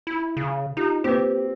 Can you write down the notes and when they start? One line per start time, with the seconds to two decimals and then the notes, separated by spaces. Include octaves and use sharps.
0.07 E4
0.37 C#3
0.77 D#4 F4 G4
1.04 A#3 C4 G4 B4